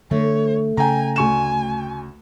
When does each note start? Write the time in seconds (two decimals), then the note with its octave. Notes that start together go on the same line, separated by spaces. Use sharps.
0.11 D3 A3 C#5
0.77 C#3 G5 G#5 A#5
1.16 D2 G#5 C#6 E7